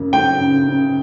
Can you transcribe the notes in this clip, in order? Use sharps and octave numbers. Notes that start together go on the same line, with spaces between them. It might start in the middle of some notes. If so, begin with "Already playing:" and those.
Already playing: F#2 C#3 A#3
F#3 G5
C#3
C#3